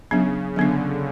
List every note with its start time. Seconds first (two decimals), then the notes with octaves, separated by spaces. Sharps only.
0.11 C#3 F#3 B3 D4
0.56 D3 F#3 B3 D4